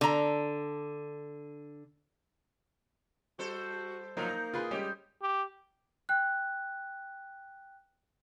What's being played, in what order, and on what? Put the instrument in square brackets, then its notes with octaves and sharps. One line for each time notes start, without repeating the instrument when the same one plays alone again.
[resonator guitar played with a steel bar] D3 A#5
[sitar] G3 A4 C5 [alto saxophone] F#4
[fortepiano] F3 F#3 [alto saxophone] A#3 [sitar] D#4
[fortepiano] A#5
F4 G#4 B4
[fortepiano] G3 G#3 C#4 [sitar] G4
[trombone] G4
[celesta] G5 F#6